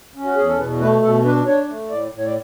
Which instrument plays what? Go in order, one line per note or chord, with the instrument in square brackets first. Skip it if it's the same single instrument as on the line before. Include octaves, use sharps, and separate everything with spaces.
[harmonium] C#4
F#4
E2 G#4
A4
B2 B4
A3 B4
B2 A4
D4 B4
D4 C#5
A3
A2 D5
A2
C#5
D5